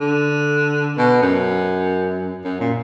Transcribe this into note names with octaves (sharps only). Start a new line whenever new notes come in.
D3
B2
F#2
F#2
A#2